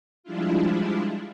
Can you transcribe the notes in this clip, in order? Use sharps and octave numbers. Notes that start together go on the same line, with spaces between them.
F3 G3 G#3 D4 E4 F4